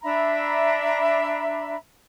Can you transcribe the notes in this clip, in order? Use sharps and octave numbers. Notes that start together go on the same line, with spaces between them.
D4 E5 A#5 B5